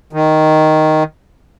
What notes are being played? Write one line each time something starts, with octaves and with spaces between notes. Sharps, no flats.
D#3